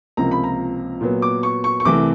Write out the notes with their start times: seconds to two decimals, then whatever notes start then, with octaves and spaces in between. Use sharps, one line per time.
0.17 C#2 C3 F3 A#3 A#5
0.31 B5
0.44 A#5
1.01 A#2 F#3 B3
1.22 D6
1.43 C#6
1.64 C#6
1.80 C#6
1.85 C2 C3 E3 A3 D6